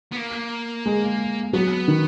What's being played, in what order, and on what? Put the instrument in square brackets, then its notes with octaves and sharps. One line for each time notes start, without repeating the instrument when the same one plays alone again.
[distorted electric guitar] B3
A#3
[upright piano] G#3
[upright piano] F#3 [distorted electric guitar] B3
[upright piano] D#3